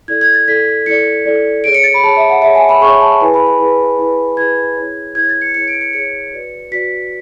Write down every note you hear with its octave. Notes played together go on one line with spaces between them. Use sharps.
E4 A4 D5 G#6
G#6
A6
E4 A4 D5 B6
E4 A4 D5 C#7
E4 A4 D5
G#4 C#5 D7
C#7
A6
B5
G#4 C#5 A5
E5
F#5
G#4 C#5 E5
G#5
B5
G#4 C#5 C#6
A5
E4 G#4 B4 G#5
B5
B5
E4 G#4 B4
E4 G#4 B4
E4 G#4 B4 G#6
E4 G#4 C#5
E4 G#4 C#5 G#6
A6
C#7
E4 G#4 C#5 C#7
D7
C#7
E4 G#4 C#5 C#7
F#4 B4 D5
F#4 B4 D5 B6